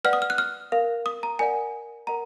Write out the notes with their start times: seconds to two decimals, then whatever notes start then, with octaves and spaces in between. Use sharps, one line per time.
0.04 B4 D5 F#5 F6
0.13 D#6
0.22 F6
0.30 F#6
0.38 F6
0.72 A#4 F5
1.06 D#6
1.23 A#5
1.39 A#4 D5 F#5 G#5
2.07 A#4 D#5 F#5 A#5